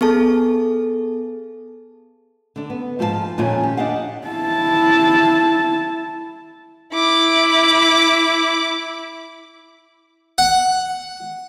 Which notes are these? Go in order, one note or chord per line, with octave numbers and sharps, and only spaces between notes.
B3 G#4 A4 A5
D3 D4
B3
G#2 F3 G4 A4 F5 A5
F2 A#2 D#3 C#4 F4 G#5
G4
D4 G4 D#5 F5 F#5
E4 A5
E4 D6
F#5